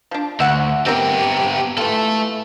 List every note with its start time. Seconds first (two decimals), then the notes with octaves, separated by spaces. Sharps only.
0.11 F3 D4
0.40 D2 E5 F#5
0.86 B3 C4 G4 A#4
1.78 E3 A3 F4 A4